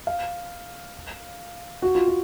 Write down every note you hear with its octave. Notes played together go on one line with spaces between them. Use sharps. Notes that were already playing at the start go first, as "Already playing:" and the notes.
F5
F#4
F4
F#4